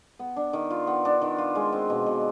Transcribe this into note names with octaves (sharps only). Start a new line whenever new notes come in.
B3
D4
D#3
F4
B3
D4
D#3
F4
G#3
C4
B2
B2